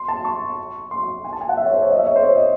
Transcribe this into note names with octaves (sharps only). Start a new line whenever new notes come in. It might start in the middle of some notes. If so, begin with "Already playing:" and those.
Already playing: C6
A5
C#6
C6
G#5
A5
G#5
F#5
E5
C#5
C5
C#5
D#5
E5
C#5
C5
C#5
D#5